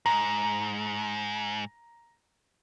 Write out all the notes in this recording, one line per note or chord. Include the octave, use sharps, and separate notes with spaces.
G#2 A#5